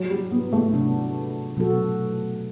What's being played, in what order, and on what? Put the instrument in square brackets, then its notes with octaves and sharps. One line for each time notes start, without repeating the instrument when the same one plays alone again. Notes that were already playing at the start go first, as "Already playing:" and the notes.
Already playing: [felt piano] F#3
G3
B3
A3
[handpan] C3 F#3 B3 D4
B2 F#3 B3 F#4 A4